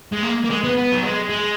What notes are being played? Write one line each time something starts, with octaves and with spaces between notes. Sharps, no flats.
G#3
A#3
A#3
G#3
B3
B3
F#3
G#3
G#3